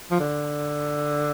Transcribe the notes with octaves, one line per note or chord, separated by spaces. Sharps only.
F3
D3